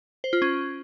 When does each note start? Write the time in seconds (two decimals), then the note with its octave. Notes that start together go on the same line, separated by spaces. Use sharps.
0.24 C5
0.33 F4
0.42 C#4